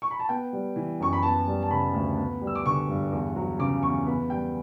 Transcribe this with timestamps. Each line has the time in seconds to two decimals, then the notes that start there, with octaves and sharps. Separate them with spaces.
0.02 C#6
0.11 B5
0.19 A5
0.29 B3 G5
0.53 G3
0.76 E3
1.00 F#2 C#6
1.13 B5
1.23 B3 A5
1.47 G3
1.63 A5
1.71 C#3 B5
1.94 D2
2.17 B3
2.41 G3
2.47 E6
2.55 D6
2.65 D3 C#6
2.89 G2
3.12 E2
3.36 F#3
3.59 C#3 D6
3.83 E2 C#6
4.06 B3 B5
4.30 G3 G5